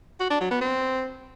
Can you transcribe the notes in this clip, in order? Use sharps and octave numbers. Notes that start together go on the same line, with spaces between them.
F#4
D4
F#3
B3
C4